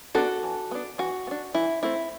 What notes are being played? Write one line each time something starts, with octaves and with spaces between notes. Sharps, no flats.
B3 D4 F#4 A4
E3
B3 D4
E3 F#4
B3
D4
E3 E4
A3 C4 E4